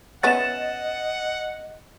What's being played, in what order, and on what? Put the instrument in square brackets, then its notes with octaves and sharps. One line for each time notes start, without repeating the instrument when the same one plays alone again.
[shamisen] B3 C#4 E4 [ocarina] D#5 [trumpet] F#5 [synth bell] A6 E7